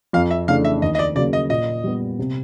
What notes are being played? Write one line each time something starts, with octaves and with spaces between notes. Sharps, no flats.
F2 F5
E5
C#3 E3 A3 D4 F5
E5
D#2 D#5
D#5
D5
C#3 F#3 A#3 D5
D#5
A#2 D#5
G3 B3
C3